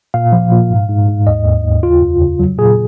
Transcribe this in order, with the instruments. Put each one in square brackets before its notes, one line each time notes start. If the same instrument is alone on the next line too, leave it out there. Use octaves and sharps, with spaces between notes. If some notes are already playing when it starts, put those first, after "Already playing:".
[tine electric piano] A#2 F5
F3
A#2
G#2
G#2
G#2
D#2 D#5
D#2
D#2
C#3 F4
F2
C#3
F#3
A#2 G#4